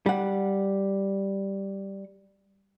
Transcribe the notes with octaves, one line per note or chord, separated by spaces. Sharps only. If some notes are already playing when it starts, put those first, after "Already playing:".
G3 F#5